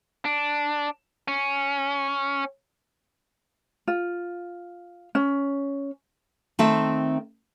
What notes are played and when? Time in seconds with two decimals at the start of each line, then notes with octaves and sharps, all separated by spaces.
0.25 D4
1.28 C#4
3.88 F4
5.15 C#4
6.59 D#3 A3 C4 E5